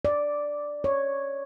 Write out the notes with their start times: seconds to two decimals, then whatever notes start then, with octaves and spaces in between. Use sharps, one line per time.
0.05 D5
0.84 C#5